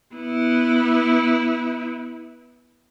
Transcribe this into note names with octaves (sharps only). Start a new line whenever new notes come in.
B3 E4